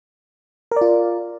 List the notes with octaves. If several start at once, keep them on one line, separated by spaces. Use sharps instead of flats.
F4 A#4 D5